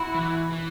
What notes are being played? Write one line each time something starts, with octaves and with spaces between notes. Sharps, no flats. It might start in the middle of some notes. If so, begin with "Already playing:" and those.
Already playing: E4 F#4
E3
E3